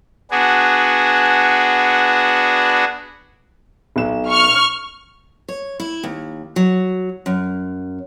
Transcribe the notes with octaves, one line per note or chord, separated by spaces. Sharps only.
B3 D4 F#4 G#4
B1 E7
C#6 F6
C#5
E4
D#2
F#3
F#2